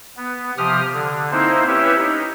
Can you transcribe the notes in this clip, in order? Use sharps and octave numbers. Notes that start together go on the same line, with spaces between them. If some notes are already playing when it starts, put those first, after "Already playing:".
B3
C3 F3 G4 D#6 F6
D3
A#3 C4 D#4 E4 C5
C#4 E4 G4 B4 C#5 E5
D#4